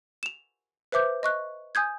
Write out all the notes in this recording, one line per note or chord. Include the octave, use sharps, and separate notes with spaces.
E7 F7
B4 C5 E5 D6 G6
D#5 C#6 F#6
G#5 D#6 G6 G#6